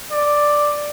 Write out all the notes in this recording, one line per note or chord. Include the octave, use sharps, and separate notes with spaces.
D5